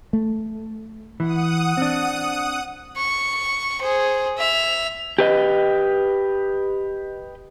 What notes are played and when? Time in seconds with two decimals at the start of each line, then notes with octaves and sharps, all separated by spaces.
0.13 A3
1.20 E3 F#5 D#6
1.77 C4 D4
2.97 C#6
3.82 G#4 C5
4.37 E5 F7
5.19 G4 B4 D#5